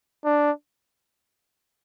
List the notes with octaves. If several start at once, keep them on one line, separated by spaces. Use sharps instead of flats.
D4